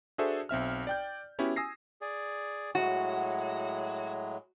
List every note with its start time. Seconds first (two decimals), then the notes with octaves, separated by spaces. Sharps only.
0.18 D4 F#4 G#4 A4 C5 E5
0.49 B1 C4 E5 F6
0.87 D5 G5 G6
1.39 B3 C#4 E4 F#4 G4
1.56 G#5 D#6 E6 A#6 C7
2.01 G#4 D5
2.75 A2 F#3 G#3 F#4